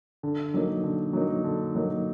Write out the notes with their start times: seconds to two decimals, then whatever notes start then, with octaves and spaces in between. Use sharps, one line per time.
0.23 D3
0.54 F#3 A#3 D#4
0.83 D3
1.13 F#3 A#3 D#4
1.44 D3
1.75 F#3 A#3 D#4